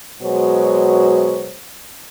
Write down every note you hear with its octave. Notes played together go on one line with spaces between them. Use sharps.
B2 F#3 G#3 F#4 C5 C#5